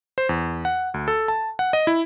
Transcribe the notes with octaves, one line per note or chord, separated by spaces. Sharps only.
C5
E2
F#5
D2
A4
A5
F#5
D#5
E4